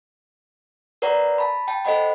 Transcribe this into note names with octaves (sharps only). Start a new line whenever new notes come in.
A#4 B4 C#5 D5 F#5 A#5
A5 B5
G5 A5
A4 C5 D#5 F#5 B5